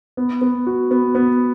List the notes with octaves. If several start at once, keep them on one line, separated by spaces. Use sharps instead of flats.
B3
B3
F#4
B3
B3